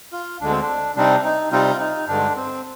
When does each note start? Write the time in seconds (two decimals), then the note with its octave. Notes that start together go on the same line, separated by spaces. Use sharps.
0.12 F4
0.41 D2 D3 G#3 D4
0.50 C4
0.61 D4
0.96 C3 G3 C4 D4 D#4
1.24 D#4
1.51 C3 G3 C4 D#4 F4
1.80 D#4
2.08 G2 D3 G#3 D4
2.36 C4